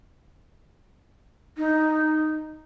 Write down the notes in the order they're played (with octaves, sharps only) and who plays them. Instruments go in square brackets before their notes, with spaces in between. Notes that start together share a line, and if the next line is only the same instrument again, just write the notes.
[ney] D#4